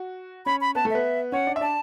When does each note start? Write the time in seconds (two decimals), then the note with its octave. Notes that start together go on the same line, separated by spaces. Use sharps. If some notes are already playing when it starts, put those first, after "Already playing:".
Already playing: F#4
0.46 C#4 C#5 B5
0.61 B5
0.75 B3 B4 A5
0.85 A3 A4
0.90 B3 B4 E5
1.32 C#4 C#5 F#5
1.47 D4 D5
1.56 E5
1.61 D4 D5 A5